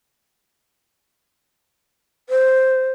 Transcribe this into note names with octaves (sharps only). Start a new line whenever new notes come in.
C5